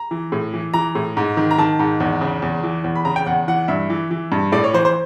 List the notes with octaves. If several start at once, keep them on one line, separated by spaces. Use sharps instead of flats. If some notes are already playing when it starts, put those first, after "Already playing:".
Already playing: A#5
E3
A2
E3
E3 A#5
A2
G#2
D#3
A#5
D#3 A5
G#2
E2
C#3
E2
E3
E2
B5
C#3 A#5
G5
E2 F#5
E3 F#5
G2 E5
E3
E3
G2
A2 D5
C#5
E3 C5
C5